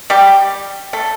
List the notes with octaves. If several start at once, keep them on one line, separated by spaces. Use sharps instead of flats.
G3 G4
A3 A4